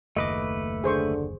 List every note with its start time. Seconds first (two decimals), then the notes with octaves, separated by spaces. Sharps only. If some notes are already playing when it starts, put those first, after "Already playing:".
0.16 F#1 D#2 A3 B4 D#5 D6
0.84 D3 G#4 C5 C#6